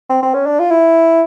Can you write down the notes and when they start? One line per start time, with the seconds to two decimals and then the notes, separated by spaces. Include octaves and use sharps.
0.10 C4
0.23 C4
0.34 C#4
0.46 D4
0.59 F4
0.71 E4